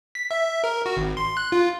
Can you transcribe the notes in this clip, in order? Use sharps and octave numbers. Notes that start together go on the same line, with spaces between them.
B6
E5
A#4
F#4
G#1
C6
F#6
F4